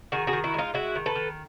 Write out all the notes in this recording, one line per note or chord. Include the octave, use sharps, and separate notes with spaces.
D#3 F#4 G#4
F#4 G#4
D#3
E4 F#4
G#3 D#4 F4
G#3 E4 F#4
D#3
A4 B4
D#3